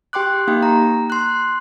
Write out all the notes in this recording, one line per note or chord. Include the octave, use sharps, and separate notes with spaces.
G4 G5 C6 D6 F#6
A#3 D#4 G4 F5 G5
A#5
C6 F#6